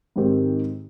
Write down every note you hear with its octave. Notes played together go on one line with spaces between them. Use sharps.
G#2 D#3 G#3 C4 G4